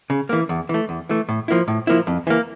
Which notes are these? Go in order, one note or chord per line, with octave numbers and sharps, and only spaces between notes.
C#3
E3 A#3
E2
E3 A3
E2
E3 A3
A2
F3 A#3 E4
A2
F3 A#3 E4
F2
E3 A#3